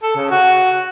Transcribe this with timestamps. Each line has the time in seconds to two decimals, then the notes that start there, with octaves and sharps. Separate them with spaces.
0.03 A4
0.15 C#3
0.30 F#4